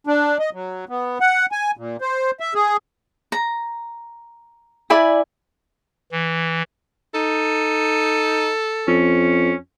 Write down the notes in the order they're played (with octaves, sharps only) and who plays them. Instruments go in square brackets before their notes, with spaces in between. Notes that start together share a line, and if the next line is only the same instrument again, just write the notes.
[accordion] D4
D#5
F#3
B3
F#5
G#5
A#2
C5
E5
G#4
[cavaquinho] A#5
E4 D5 G#5 B5
[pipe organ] E3
[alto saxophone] D#4 [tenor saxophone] A4
[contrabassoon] F2 [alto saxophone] C#4